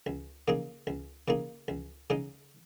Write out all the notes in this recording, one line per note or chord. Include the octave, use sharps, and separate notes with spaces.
C#2
C#3 A#3 D#4 G#4
C#2
C#3 A#3 D#4 G#4
C#2
C#3 G#3 D#4